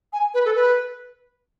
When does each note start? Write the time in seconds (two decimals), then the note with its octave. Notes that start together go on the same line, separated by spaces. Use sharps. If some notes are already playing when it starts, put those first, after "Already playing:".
0.13 G#5
0.34 B4
0.45 A4
0.55 B4